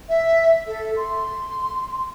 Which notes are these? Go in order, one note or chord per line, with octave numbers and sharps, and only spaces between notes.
E5
A4
C6